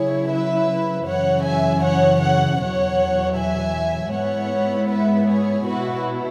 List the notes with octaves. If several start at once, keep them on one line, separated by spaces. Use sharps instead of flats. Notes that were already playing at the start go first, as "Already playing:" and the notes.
Already playing: C#3 F#3 E4 G#4 C#5
B4 E5
F#2 C#3 E3 C#5 F#5
E5 G#5
C#5 F#5
C#5 F#5
E2 B2 F#3 C#5 F#5
E5 G#5
G#2 G#3 B3 E4 C#5 F#5
B4 E5
G#4 C#5
B2 B3 E4 F#4 B4